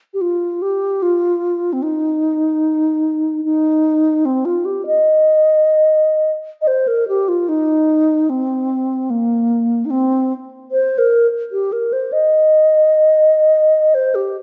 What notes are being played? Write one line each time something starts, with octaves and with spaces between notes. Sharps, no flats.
G4
F4
G4
F4
C4
D#4
D#4
C4
F4
G4
D#5
D#5
C5
A#4
G4
F4
D#4
C4
A#3
D#4
C4
C5
A#4
G4
A#4
C5
D#5
C5
G4